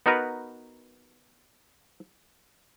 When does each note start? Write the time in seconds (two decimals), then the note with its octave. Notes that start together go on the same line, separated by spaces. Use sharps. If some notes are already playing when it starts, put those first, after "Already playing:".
0.06 B3 D#4 F#4 A#4 B4